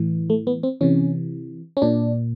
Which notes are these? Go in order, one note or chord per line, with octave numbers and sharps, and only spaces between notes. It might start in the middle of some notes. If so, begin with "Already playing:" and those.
Already playing: A2 E3
A3
B3
C4
C3 E3 C#4
C#4
A#2 D4